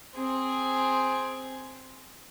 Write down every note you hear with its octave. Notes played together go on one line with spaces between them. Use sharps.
C4 G#4